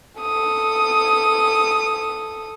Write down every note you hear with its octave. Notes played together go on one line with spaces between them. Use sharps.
A4 D#6